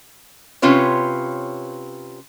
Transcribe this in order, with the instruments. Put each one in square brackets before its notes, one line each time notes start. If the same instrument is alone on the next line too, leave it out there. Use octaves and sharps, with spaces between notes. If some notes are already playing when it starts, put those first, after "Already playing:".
[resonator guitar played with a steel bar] C3 C#4 F4 B4 C#5